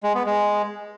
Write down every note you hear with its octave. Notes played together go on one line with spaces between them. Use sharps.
G#3
B3
G#3